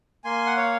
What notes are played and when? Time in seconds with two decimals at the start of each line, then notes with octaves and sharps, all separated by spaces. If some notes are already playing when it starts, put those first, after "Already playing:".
0.24 A#3 G#5 C6
0.46 F#5
0.57 C#5 F5